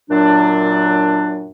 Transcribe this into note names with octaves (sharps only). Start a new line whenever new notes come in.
F#2 A#2 F#3 D4